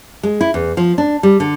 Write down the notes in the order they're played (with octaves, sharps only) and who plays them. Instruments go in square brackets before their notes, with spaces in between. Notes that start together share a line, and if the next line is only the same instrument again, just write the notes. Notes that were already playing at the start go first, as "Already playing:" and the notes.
[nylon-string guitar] G#3
E4
E2
F3
D4
G3
D3